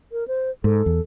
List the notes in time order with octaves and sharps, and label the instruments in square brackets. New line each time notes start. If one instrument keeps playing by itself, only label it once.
[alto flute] A#4
C5
[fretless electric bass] G#2 [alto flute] A4
[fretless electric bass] E2